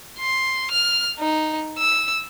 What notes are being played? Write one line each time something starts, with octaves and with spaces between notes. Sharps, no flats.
C6
F6
D#4
E6